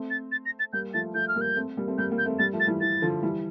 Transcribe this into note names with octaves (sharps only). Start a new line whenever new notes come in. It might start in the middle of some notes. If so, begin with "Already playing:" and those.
Already playing: A3 C4
A6
A6
A#6
A6
G3 A#3 G6
F3 A3 A6
F3 A3 G6
F6
G3 A#3
G6
A3 C4
G3 A#3
A3 C4
G3 A#3 G6
G3 A#3
G6
A3 C4
G3 A#3 A6
F3 A3
A6
E3 G3
E3 A6
D3 F3
E3 G3